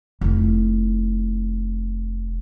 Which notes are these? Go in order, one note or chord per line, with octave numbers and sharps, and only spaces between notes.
F1 E4